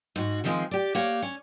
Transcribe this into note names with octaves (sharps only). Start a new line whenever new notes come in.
G#2 F#4
D3 D#3 F3 F#3 G#3 C4
G4 D5
A#3 G4 C#5 F#5
C#4